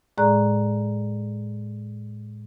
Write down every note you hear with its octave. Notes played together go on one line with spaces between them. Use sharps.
A2 G#3 G#4 D5 A#5 F#6